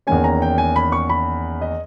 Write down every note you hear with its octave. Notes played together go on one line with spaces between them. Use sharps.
E2 D#3 A#3 C#4 G#5
A#5
G5
G#5
B5
C#6
B5
D#5